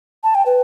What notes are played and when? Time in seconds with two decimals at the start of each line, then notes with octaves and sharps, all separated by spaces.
0.23 A5
0.35 G5
0.46 B4